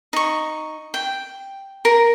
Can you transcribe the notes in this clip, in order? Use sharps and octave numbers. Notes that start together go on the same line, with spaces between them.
D#4 C#6
G5
A#4